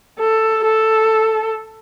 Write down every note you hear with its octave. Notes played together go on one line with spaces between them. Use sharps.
A4
A4